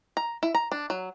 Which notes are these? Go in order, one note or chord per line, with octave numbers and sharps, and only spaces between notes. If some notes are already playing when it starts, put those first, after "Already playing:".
A#5
E4
A#5
D4
F#3